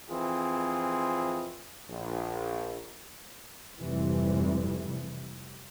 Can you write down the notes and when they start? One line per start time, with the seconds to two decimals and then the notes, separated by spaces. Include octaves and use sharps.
0.10 F2 E3 C4 F4 G#4
1.90 A#1
3.80 F1 F2 G#2 C3 E3 G3